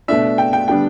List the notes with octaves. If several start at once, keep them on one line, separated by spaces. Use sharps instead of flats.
B2 A3 D4 E5
G5
G5
D3 G3 B3 D4 G5